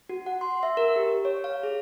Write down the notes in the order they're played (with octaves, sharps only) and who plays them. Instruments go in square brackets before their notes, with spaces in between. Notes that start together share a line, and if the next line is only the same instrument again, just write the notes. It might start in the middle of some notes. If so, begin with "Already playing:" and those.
[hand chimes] F#4
F#5
C6
E5
A#4
G4
C#5
F5
G#4